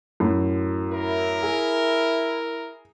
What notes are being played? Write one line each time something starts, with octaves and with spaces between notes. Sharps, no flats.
F#2 A2
E4 A#4
G#4